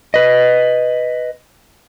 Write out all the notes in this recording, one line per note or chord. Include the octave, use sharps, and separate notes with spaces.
B4 D#5